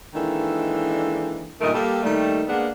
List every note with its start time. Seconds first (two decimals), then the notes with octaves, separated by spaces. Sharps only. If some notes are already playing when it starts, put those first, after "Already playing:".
0.14 D#3 E3 G#3 A#3 D4 A4
1.61 G2 A#2 D#3 A3 A#4 D#5
1.74 G3 A#3 G4 A4
2.02 D#2 D#3 G3 A3
2.48 G#3 A#3 B3 D4 G#4 F#5